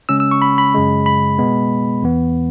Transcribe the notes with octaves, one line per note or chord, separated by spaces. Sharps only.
C#3 G#3 C#4 E6
E6
C#6
B5
B5
F#2 C#3 G#3
B5
B2 G#3 B3
E2 E3 B3